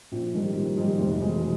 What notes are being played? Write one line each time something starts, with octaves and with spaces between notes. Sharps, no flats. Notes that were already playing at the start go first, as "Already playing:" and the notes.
A#1
G#2 D#3 G3
A#1
G#2 D#3 G3
F1
E2 B2 G#3